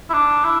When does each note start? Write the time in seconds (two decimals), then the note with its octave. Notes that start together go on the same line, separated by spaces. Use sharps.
0.10 E4
0.14 D4
0.45 E4